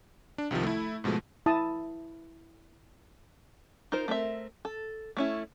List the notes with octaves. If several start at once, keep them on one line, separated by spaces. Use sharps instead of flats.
D4
C2 C3 D#3 F3
A3 E4
G#2 B2 F3 G#3 A3
E4 A5 D#6
D#4 F4 A#4 C5
A3 C4 A#4 E5
A4
A3 C#4 E4